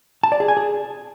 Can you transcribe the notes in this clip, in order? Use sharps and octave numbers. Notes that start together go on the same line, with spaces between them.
A5
D5
G#4
G#5
G#4